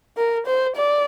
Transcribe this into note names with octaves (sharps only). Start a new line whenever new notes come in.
A#4
C5
D5